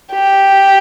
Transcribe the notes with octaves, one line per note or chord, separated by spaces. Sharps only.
G4